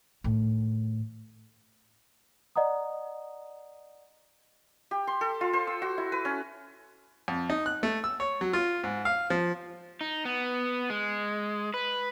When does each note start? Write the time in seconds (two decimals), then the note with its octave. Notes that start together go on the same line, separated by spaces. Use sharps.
0.24 A2 D#3
2.56 D5 D#5 F#5 A#5 D#6
4.91 G4
5.07 C6
5.21 A4
5.41 F4
5.53 C5
5.67 E6
5.82 F#4
5.98 E4
6.12 B4
6.25 C#4
7.28 F2
7.50 D#4
7.66 F#6
7.83 A3
8.04 E6
8.20 C#5
8.41 F#3
8.53 F4
8.84 G#2
9.05 F5
9.30 F3
10.01 D#4
10.25 B3
10.90 G#3
11.74 B4